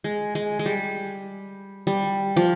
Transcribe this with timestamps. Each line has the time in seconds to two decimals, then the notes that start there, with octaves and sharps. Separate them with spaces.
0.04 G#3
0.35 G#3
0.59 G#3
0.66 G3
1.87 G3
2.36 F3